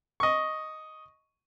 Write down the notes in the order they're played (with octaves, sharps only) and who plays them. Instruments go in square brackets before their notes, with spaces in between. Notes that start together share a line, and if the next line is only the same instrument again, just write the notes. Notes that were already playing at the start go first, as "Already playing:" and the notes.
[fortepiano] D#5 C#6